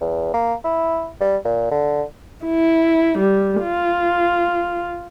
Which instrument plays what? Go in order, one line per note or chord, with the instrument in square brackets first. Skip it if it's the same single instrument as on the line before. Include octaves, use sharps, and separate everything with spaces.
[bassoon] E2
A#3
E4
G3
A#2
D3
[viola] E4
G3
F4